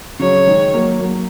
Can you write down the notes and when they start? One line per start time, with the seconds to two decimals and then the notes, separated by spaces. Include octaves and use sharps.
0.19 C#3 F#3 C#5
0.46 D#3 G#3
0.73 F#3 A#3
1.00 F#3 A#3